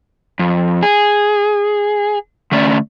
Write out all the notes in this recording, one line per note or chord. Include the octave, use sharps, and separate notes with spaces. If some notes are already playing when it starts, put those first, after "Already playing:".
F2
G#4
D3 A3 C#4 D5